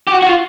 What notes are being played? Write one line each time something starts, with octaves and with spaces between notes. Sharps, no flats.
G4
F#4
F#4
F4